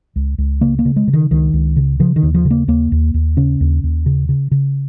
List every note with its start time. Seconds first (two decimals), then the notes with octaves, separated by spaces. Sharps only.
0.16 C#2
0.38 C#2
0.61 C#3 A#3
0.79 A#3
0.85 C#3
0.96 G#3
1.08 C#3
1.13 D#3
1.31 C#2 D#3
1.53 C#2
1.76 C#3
2.00 C#3 F3
2.16 D#3
2.23 D#2
2.34 F3
2.45 C#3
2.51 A#3
2.68 D#2 A#3
2.92 D#2
3.14 D#2
3.37 C#3 C#4
3.61 D#2
3.84 D#2
4.06 C#3
4.29 C#3
4.51 C#3